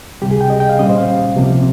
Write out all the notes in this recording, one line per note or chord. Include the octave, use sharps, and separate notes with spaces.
C#2 C3 G3 G4
G#4
G5
D#5
G5
F5
A#2 G3 C#4 D#5
C5
F5
C#2 C3 F3 A#3